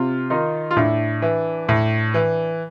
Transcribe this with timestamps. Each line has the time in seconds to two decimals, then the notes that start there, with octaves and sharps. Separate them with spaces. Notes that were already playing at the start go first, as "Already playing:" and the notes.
Already playing: C3 F4
0.30 D#3 D#4 F4
0.71 F4
0.77 A2 D4 E4
1.22 E3
1.69 A2
2.14 E3